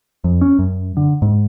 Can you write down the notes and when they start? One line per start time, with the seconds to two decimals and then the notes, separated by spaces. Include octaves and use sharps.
0.24 F2
0.41 C#4
0.59 F#2
0.97 D3
1.22 G#2